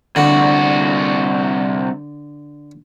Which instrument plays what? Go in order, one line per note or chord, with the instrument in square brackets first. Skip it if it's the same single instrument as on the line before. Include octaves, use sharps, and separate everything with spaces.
[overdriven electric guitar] C2 F#4 [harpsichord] D3